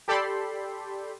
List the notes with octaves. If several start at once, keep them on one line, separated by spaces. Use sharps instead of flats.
G4 A4 D5 G5 B5 C6